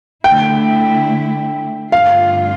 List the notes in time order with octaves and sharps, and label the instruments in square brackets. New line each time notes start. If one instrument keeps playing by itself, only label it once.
[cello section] D3 A3 E4 [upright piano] G5
[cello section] G2 D3 A3 C4 F4 [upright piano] F5